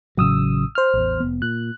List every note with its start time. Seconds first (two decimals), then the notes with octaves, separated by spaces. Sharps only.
0.18 A1 C#3 F#3 D#6 E6
0.75 C5 F6
0.94 A1 E2
1.20 F1 B3
1.42 A#2 F#6